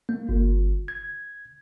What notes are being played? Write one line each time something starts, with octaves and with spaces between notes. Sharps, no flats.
A#3
G1
G#6